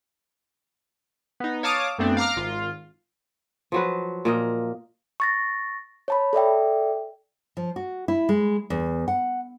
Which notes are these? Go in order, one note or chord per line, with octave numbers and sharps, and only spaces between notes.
B3 D#4
C#5 F5 A5 D6 D#6
F#2 A3 B3 C4 D4
F5 A#5 D6 F6
G#1 F4 F5
F3 F#3 B4
A#2 A#3 D#5
C#6 A6 A#6
C#5 A5 B5
A4 D5 E5 G5
F3
F#4
E4
G#3
E2
F#5